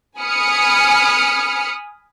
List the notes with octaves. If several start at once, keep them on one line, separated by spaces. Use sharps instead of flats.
G#5 B5 D#6 F6 C#7